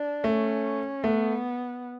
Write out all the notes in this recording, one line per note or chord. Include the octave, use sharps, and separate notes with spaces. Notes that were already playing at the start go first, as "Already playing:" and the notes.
Already playing: D4
A3 C#4
A3 B3